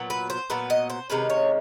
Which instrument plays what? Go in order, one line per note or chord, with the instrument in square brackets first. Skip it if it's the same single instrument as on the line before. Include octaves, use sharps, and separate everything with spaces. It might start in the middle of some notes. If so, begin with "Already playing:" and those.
Already playing: [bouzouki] A#2 F#3 B3
B4
C5
A#2 F#3 B3 B4
D#5
C5
C3 D#3 G#3 C#4 B4
C#5